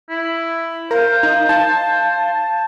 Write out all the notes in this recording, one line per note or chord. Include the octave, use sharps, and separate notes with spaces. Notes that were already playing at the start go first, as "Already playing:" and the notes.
E4
A#4 C5 F5
D#4
A5